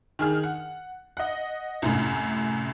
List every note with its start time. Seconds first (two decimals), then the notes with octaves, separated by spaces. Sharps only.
0.19 D#3 G#4 F6
0.43 F#5
1.17 D#5 F#5
1.82 C2 F#2 A2